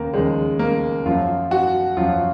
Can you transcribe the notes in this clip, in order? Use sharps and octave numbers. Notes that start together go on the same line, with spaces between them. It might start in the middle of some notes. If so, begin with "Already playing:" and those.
Already playing: D#2 C#3 A#3
D#2 C#3 F3 G#3
A#3
F#2 F3 F4
F#4
F#2 F3 F4